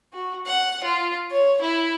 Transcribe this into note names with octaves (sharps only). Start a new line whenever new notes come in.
F#4
F#5
F4
C#5
E4